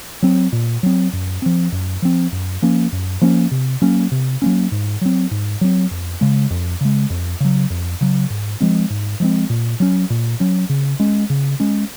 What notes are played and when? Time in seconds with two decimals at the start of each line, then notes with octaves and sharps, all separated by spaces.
0.22 F#3 C4
0.52 A#2
0.83 F#3 C4
1.13 F#2
1.42 F3 C4
1.72 F#2
2.02 F3 C4
2.32 F#2
2.62 F3 A#3 C#4
2.92 F#2
3.21 F3 A#3 C#4
3.51 C3
3.82 F#3 A#3 C#4
4.11 C3
4.42 F#3 A#3 C#4
4.72 G#2
5.01 F#3 C4
5.31 G#2
5.61 F#3 C4
5.91 F2
6.21 C#3 G#3
6.50 F2
6.81 C#3 G#3
7.10 F2
7.40 C#3 F#3
7.70 F2
8.01 C#3 F#3
8.30 G#2
8.60 F3 G#3 C4
8.90 G#2
9.20 F3 G#3 C4
9.50 A#2
9.80 F#3 C#4
10.10 A#2
10.40 F#3 C#4
10.69 C#3
10.99 G#3 C#4
11.30 C#3
11.60 G#3 C#4